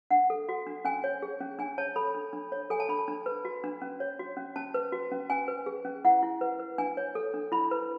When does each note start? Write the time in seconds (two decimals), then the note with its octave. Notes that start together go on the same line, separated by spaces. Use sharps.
0.11 D4 F#5
0.30 A4
0.49 F#4
0.67 D4
0.85 C#4 G#5
1.04 C#5
1.22 G#4
1.40 C#4
1.59 D4 G#5
1.78 C#5 A5
1.96 A4 B5
2.15 D4
2.33 D4
2.52 C#5
2.70 A4 G#5
2.80 A5
2.89 D4 B5
2.98 A5
3.08 D4
3.26 B4
3.45 F#4
3.64 D4
3.82 C#4
4.00 C#5
4.19 F#4
4.37 C#4
4.56 C#4 A5
4.74 B4
4.92 F#4
5.12 C#4
5.30 C#4 G#5
5.48 B4
5.66 G#4
5.85 C#4
6.05 E4 F#5
6.23 E4
6.41 B4
6.60 B4
6.78 D4 G#5
6.97 C#5
7.15 A4
7.34 D4
7.52 E4 B5
7.71 B4